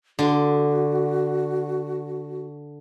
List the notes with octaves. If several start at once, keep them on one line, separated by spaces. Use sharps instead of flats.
D3 F#4 C6